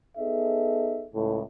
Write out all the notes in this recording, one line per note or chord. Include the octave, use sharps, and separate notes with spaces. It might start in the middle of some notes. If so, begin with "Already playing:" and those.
B3 D#4 G#4 A4 D#5 E5
C#2 A2